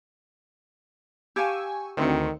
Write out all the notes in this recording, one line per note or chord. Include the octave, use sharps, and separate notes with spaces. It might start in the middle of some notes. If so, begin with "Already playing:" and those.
G4 F5 G#5 A5 C#6 E6
D2 D#3 C4 C#7